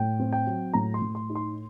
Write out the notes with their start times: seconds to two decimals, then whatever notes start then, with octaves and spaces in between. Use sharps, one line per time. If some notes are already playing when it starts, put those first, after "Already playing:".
Already playing: A2 G5
0.20 C4
0.33 G5
0.47 F#3
0.73 A2 A#5
0.94 C6
1.01 A2
1.15 C6
1.30 D#4
1.35 C6